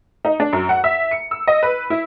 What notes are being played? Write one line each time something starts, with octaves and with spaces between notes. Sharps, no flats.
D#4
D4
F#2
F#5
E5
C#7
E6
D#5
B4
E4